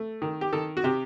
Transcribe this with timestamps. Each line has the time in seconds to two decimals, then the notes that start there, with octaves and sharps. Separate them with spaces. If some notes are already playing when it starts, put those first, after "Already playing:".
Already playing: A3
0.22 D#3
0.41 G4
0.53 D#3 A4
0.77 F#4
0.84 C3 G4